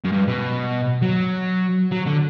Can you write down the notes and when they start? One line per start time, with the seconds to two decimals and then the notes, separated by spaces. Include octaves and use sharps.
0.04 F#2
0.12 G2
0.28 B2
1.02 F#3
1.92 F#3
2.07 D3